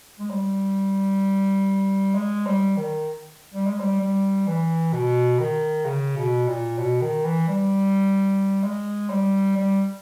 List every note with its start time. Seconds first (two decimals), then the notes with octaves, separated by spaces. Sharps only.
0.19 G#3
0.30 G3
2.15 G#3
2.46 G3
2.77 D#3
3.54 G3
3.67 G#3
3.80 G3
4.00 G3
4.47 E3
4.93 B2
5.40 D#3
5.85 C#3
6.17 B2
6.48 A#2
6.78 B2
7.02 D#3
7.25 E3
7.48 G3
8.64 G#3
9.10 G3
9.56 G3